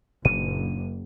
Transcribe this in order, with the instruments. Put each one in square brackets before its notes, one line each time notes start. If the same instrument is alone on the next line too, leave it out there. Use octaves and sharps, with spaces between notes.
[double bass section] F#1 [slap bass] A#2 D4 [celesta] D#7